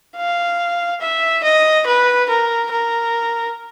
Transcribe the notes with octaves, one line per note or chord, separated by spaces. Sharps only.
F5
E5
D#5
B4
A#4
A#4